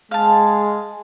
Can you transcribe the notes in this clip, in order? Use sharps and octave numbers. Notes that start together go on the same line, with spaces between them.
G#3 F5 A5